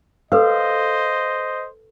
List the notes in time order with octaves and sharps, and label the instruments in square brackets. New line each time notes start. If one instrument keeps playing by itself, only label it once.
[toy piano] A4 B4 E6 [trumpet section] C5 D#5 [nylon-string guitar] F5